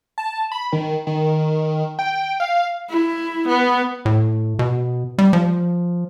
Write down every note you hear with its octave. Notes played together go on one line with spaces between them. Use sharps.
A5
B5
D#3
D#3
G5
F5
E4
B3
A2
B2
G3
F3